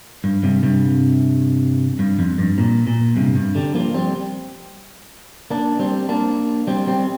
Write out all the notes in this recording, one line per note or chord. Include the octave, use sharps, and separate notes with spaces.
G2
G2 C3
G2 C3
G2
F2
G2
A#2
A#2
G2 C3
G2
D3 G3
F3 A#3
G3 C4
A#3 D4
G3 C4
A#3 D4
G3 C4
G3 C4